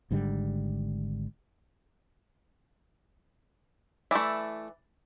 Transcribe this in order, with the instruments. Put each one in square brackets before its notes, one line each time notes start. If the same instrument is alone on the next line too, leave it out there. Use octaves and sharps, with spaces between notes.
[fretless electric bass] G#1 G#2 D3 G3
[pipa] E3 D5 [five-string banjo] A3 E4